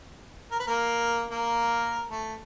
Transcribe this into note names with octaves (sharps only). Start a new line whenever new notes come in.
A#4
B4
A#3 A#4
A#3 A#4
A3 A4